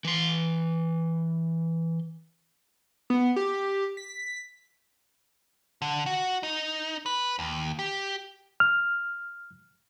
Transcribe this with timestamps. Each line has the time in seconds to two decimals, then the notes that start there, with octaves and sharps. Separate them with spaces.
0.05 E3 C6
3.10 B3
3.36 G4
3.97 B6
5.82 D3
6.06 F#4
6.43 D#4
7.06 B4
7.39 D#2
7.79 G4
8.60 F6